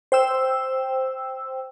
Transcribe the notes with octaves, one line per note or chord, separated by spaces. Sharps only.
C5 G5 E6